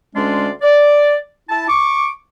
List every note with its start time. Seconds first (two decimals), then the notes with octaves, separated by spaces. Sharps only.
0.15 D2 G#3 C#4 D4 D5 C6
0.62 D5
1.49 E4 A5
1.68 C#6 D6